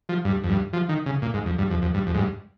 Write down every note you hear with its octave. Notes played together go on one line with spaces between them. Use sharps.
F3
G2
F2
G2
F3
D#3
C#3
A#2
G#2
F2
G2
F2
F2
G2
F2
G#2
G2